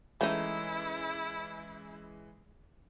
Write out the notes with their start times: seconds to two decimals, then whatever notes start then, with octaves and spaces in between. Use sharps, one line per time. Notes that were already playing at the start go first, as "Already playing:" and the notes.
0.21 E3 G#3 A3 C#4 D#4 E4